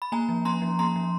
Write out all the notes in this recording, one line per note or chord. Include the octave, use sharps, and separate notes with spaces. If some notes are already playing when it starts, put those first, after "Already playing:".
B5
A#3 G#5 A#5
F3
C#4 A#5 C6
F3
A#3 A#5 C6
F3